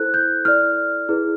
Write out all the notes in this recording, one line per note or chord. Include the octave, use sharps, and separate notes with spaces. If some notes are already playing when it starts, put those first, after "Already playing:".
Already playing: E4 A4 C5 F#6
G6
E4 A4 D5 F6
E4 G#4 B4